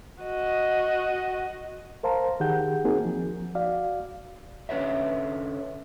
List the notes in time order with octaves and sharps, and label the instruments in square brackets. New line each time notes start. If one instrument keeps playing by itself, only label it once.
[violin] F#4 D#5
[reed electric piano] A#4 C5 F5 A5 A#5
D#3 G4 G#4 F#5 G6
A#3 C4 D#4 F#4 G#4 A#4
F3
F#4 D5 F5
[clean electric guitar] D3 C#4 F4 B4 C#5 E5